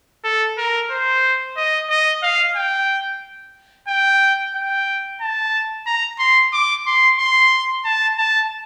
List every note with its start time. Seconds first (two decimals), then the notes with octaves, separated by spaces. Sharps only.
0.24 A4
0.58 A#4
0.91 C5
1.57 D#5
1.90 D#5
2.23 F5
2.56 G5
3.88 G5
4.55 G5
5.21 A5
5.86 A#5
6.19 C6
6.53 D6
6.86 C6
7.18 C6
7.85 A5
8.18 A5